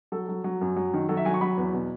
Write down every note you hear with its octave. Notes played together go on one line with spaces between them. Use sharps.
F#3 A4
F#3
F#3
F#2
F#3
D#3
F#3 A4
E5
F#3 G#5
C#6
F#3 B5
E2
B2